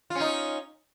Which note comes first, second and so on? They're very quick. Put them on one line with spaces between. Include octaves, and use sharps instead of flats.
F4 C#4 D#4